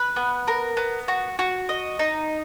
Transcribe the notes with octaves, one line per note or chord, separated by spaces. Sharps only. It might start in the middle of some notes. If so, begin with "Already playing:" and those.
Already playing: B4
B3
A#4
B3
F#4
F#4
D#5
D#4